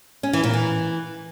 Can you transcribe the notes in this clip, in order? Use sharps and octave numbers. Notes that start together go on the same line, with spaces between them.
C#4
E3
A#2
E3